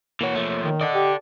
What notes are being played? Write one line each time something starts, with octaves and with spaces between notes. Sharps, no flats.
E3 A#3 F#4 C#5
F3 A3
D#3
A4 D5 D#5 F#5
G4